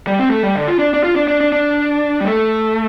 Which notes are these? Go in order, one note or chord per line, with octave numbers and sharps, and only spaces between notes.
G3
C4
A3
G3
D3
F4
D4
D4
F4
D4
D4
D4
D4
G3
A3